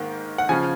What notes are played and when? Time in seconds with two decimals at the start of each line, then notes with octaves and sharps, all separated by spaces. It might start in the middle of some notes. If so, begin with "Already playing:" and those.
Already playing: G#2 D#3 A#3
0.38 F#5
0.49 C#3 F3 G#5